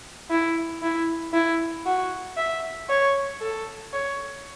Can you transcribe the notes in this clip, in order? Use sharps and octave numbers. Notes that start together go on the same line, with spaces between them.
E4
E4
E4
F#4
E5
C#5
A4
C#5